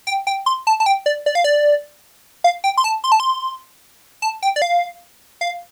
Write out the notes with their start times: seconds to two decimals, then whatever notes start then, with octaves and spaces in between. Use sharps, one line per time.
0.07 G5
0.27 G5
0.46 C6
0.67 A5
0.80 A5
0.86 G5
1.06 D5
1.26 D5
1.35 F5
1.44 D5
2.44 F5
2.64 G5
2.77 C6
2.84 A5
3.04 C6
3.12 A5
3.20 C6
4.22 A5
4.43 G5
4.56 D5
4.62 F5
5.41 F5